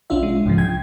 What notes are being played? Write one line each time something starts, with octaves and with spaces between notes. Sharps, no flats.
B1 C#4 D4 F4 E5
G#3
C2 G#2 C#3 F3
G5 G#6